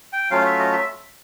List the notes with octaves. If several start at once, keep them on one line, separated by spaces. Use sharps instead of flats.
G5
F#3 A3 C#4 F4 F5
E5
D#5
E5